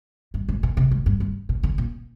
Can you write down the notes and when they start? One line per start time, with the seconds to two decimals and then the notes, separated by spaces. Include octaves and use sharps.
0.34 G2
0.49 G#2
0.63 A#2
0.77 C3
0.91 G#2
1.06 G2
1.20 G2
1.49 A#2
1.63 D3
1.78 A#2